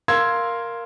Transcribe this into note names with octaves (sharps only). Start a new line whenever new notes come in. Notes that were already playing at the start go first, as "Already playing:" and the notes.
A#4 F5 C6 E6 G#6